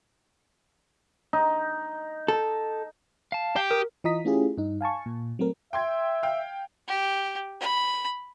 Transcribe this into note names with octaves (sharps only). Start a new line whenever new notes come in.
D#4
A4
F5 A5
G4 C7
A#4 D#6
E3 F4 D#5 A#5 D#6 B6
A3 C#4 E4 F4 G4 G#4
G2 D#4
F5 G#5 A5 C#6
A#2
F#3 A3 C4 A#4
E5 G5 C6 G#6
F5 G5
G4
B5